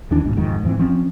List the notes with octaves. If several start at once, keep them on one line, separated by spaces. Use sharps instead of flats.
D#2 D#3 E3 D4
A#1 G#2 B2
E1 F2 G#2 D#3
F2 G#2 E3 C4
E3 F3 C4 C#4